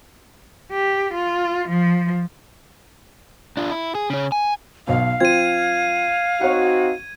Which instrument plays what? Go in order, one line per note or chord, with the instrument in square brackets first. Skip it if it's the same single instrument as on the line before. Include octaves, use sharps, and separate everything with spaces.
[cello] G4
F4
F3
[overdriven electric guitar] D4 F4
E4
G#4
C#3 C#4
G#5
[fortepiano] B1 B2 [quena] F5
[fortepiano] F3 C4 F4 [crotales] G#6 D#7
[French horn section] C4 D#4 F#4 [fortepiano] C#5 F#5